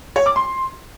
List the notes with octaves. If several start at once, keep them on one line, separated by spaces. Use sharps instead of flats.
C#5
D6
C6